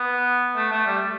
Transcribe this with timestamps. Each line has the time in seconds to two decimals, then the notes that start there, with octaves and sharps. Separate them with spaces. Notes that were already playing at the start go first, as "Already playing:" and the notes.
Already playing: B3
0.56 A3
0.72 A3
0.86 G3